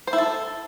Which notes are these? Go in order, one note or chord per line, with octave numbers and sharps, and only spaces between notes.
C5
E4
A4